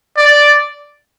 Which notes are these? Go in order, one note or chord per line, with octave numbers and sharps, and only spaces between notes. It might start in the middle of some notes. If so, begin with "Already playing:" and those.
D5